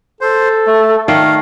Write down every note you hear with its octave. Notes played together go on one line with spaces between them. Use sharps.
A4 C5
A3
D#3 A3 D5 F5